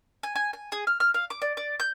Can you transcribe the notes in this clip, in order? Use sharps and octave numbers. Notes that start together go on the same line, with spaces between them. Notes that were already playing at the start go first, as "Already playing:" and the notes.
G#5
G#5
G#5
G#4
F6
F6
F5
D6
D5
D5
G6